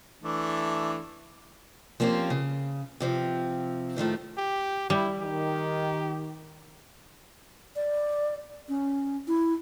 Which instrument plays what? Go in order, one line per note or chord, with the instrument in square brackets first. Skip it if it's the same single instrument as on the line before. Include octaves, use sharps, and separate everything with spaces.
[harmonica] E3 A3 D4
[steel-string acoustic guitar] F3 A#3 C4 C#4 G4
C#3
C3 F3 C4
A2 D#3 F3 A3
[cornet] G4
[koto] G3 [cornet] E4
[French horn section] D#3 [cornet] G4
[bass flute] D5
C#4
E4